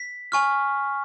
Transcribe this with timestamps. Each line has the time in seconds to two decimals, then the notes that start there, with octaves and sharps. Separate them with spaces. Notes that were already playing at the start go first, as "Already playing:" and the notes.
Already playing: B6
0.32 G#5 C#6 F6